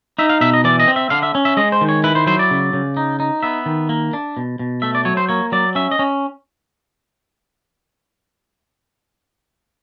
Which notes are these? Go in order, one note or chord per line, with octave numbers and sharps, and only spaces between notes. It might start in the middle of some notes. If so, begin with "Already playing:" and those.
D#4 E5
F5
B2 E5
D#5
E3 D5
D#5
C4
E5
D3 F5
E5
C#4
E5
G#3 D#5
C5
D#3
C#5
E4 B4
C5
F#3 C5
D5
C#3
C#3
D#4
D#4
B3 E5
D#3
A#3
D4
B2
B2
A3 E5
D5
F#3 C#5
C5
A#3 C#5
F#3 D5
C#4 E5
D#5
C#4